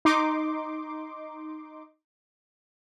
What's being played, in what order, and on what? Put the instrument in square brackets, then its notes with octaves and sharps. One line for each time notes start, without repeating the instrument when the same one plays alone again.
[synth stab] D#4 C6 D6